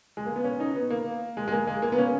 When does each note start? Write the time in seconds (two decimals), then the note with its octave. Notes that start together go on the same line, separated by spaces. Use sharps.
0.17 G#3
0.26 A#3
0.36 B3
0.44 C#4
0.60 D#4
0.75 B3
0.90 A#3
1.37 G#3
1.48 G#3
1.52 A#3
1.67 G#3
1.82 A#3
1.92 B3
1.98 C#4